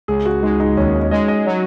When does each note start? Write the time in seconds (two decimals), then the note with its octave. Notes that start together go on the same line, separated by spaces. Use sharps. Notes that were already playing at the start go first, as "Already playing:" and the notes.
0.08 C#2 G#4
0.26 F#4
0.43 G#3 D#4
0.60 D#4
0.77 D#2 C#4
0.95 D#4
1.11 G#3 D#5
1.28 D#5
1.46 F#3